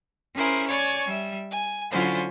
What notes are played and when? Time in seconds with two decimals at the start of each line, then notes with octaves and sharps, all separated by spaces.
0.35 C#4 E4 G#4 A#4 C5
0.67 C#5 D5 G#5 C#6
1.06 G3 E5
1.49 G#5
1.91 D3 F#3 C#4 E4 F4 C5